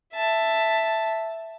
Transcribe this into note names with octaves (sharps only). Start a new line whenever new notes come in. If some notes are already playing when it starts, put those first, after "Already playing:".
E5 A5